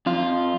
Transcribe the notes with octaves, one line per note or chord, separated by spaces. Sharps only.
F2 F4